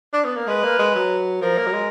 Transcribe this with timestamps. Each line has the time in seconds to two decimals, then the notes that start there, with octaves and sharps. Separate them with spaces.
0.14 D4
0.25 B3
0.37 A#3
0.47 G#3 B4
0.64 A#3
0.79 G#3
0.95 F#3
1.41 F3 A#4
1.58 A#3
1.67 F#3
1.73 G#3